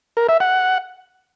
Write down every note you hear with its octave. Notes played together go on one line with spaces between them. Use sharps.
A#4
E5
F#5